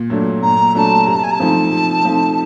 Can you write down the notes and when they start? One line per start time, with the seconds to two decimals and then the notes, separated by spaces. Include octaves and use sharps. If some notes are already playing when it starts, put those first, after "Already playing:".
Already playing: A#2
0.10 F#3 A3 D4
0.42 A#2 A#5
0.75 F#3 A3 D4 A5 A#5
1.07 C3 A#5
1.16 A5
1.24 G#5
1.31 A#5
1.35 A5
1.40 F3 A3 C4 D#4
1.72 C3
2.05 F3 A3 C4 D#4